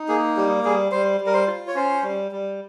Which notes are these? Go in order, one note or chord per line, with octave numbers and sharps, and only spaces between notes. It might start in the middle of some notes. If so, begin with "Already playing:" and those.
Already playing: D#4
A#3 G#4
G3 G4
G3 G#4
G3 C5
G3
A#4
C5
F4
C#5
C#4 C5
G3
G3